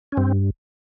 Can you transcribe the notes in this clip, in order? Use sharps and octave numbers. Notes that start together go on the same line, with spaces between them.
C#4
G2 C4